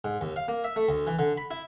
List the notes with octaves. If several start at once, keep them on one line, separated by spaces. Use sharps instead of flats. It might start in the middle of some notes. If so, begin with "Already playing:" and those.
G#2
D#2
F5
A#3
E5
A3
D2
E3
D3
B5
E4